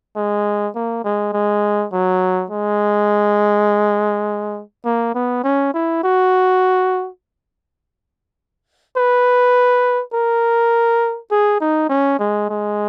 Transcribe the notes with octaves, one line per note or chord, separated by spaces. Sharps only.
G#3
A#3
G#3
G#3
F#3
G#3
A#3
B3
C#4
E4
F#4
B4
A#4
G#4
D#4
C#4
G#3
G#3